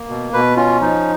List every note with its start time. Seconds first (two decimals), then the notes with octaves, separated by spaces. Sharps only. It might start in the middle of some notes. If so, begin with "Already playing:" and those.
Already playing: A#3
0.09 B2
0.33 B2 B4
0.57 C#4 F4
0.81 F3 D#4